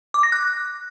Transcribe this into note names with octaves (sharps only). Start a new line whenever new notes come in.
D6
A#6
F#6